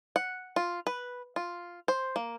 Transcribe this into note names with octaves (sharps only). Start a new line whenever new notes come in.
F#5
F4
B4
F4
C5
A#3